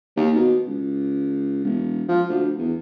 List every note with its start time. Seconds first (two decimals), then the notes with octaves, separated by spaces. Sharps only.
0.17 D#2
0.36 B2
0.67 C#2
1.64 E1
2.08 F3
2.29 D2
2.58 E2